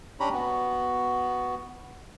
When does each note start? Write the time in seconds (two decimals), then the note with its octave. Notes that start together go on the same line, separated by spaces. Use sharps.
0.20 C#4 D4 G4 C#5 A#5 B5
0.33 B3 F#4